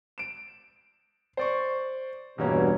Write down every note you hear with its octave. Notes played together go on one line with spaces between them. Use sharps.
D7 E7
C5 D5 C#6
E2 G2 B2 A#3 C#4